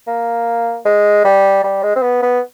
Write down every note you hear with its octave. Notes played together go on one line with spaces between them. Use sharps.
A#3
G#3
G3
G3
G#3
C4
B3
B3